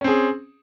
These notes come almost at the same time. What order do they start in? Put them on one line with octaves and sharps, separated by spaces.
C#4 C4 G#4